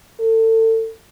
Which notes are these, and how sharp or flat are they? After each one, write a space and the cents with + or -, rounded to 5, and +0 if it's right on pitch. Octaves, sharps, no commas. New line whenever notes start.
A4 +30